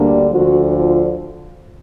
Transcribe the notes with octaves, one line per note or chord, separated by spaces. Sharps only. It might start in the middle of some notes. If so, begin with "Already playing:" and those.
Already playing: D2 D3 G3 A#3 D4
D2 D3 F3 F#4
F4